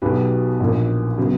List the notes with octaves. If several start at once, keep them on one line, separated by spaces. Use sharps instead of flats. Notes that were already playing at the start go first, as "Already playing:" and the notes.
B1 B2 F#3 G4 B4
A#1 A#2 A#3
C#3 F#3 B3